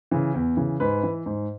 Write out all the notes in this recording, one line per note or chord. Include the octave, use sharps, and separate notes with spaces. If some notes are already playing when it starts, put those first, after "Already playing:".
C#3 E3
E2
C#3 E3
G#2 B4
E3
G#2